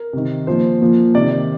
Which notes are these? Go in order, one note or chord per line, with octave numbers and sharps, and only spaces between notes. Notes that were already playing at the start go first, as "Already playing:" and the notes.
Already playing: A#4
C3 D#3
A#2 F3 C5
A#2 F3
C3 D#3 D5
D5